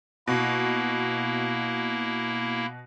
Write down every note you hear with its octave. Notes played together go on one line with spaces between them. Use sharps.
B2 A#3 E4